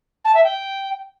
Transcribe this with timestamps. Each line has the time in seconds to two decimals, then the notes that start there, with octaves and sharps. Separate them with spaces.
0.25 A5
0.35 E5
0.44 G5